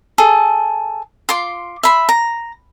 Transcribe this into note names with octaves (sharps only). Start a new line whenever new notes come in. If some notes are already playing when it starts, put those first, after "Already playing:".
G#4 A4
F4 C6 D6
E5 B5 C6
A#5